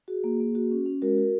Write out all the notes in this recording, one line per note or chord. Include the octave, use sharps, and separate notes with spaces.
F#4 G#4
A#3
A#3
F#4
C#4
C#4
G#3 F#4 A#4
F#4